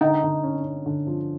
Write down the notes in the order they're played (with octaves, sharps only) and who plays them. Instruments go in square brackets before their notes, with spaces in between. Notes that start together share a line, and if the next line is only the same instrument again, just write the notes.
[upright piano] D3 [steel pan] D#4
[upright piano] D3
C#4
C#4
D3
F3